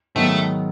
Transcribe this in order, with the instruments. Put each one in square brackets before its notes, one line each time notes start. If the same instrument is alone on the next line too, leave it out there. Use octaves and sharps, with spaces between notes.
[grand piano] G#2 D#3 F#3 B3 D#4 [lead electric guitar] A3